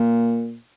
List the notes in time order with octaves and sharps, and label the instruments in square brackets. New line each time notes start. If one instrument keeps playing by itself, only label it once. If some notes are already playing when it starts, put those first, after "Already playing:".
Already playing: [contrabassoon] A#2